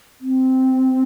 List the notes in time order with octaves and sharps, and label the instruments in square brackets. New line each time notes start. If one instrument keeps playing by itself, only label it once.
[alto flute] C4